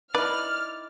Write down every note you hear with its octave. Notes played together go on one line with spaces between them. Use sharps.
D#4 E4 B4 D5 F6